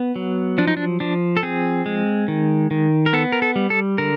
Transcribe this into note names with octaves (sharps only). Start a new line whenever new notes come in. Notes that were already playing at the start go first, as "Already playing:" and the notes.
Already playing: B3
F#3
F3 D4
D#4
D4
F3 D4
A4
C4 G#4
G#3
D#3
D#3
A#4
B3 A4
A#4
A4
G3
A4
D3 A#4